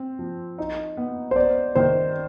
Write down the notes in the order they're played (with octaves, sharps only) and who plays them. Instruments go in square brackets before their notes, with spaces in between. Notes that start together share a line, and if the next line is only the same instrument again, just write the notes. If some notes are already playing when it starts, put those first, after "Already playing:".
Already playing: [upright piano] C4
F3
D#4
B3
[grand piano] C5
[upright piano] B3 [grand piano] D5
[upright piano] D#3 [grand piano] C5